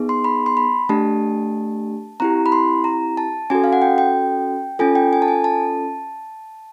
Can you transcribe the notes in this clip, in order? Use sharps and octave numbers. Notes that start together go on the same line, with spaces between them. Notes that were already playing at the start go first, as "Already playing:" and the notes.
Already playing: B3 D#4 G#4
C6
B5
C6
B5
A3 D4 G4 A5
C4 E4 G4 A#5
B5
C6
A#5
A5
C#4 F#4 A4 G#5
F5
F#5
G5
G5
C#4 F4 A4 G#5
G5
G#5
A5
G#5
A5